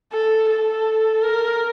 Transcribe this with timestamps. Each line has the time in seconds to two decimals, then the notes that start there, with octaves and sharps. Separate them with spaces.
0.13 A4
0.50 A4
1.22 A#4